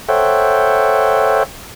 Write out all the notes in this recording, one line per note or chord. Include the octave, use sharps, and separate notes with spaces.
A4 C5 C#5 E5 F#5 G5